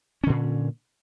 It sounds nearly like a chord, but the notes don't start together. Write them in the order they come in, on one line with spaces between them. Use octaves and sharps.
C#4 D3 A#2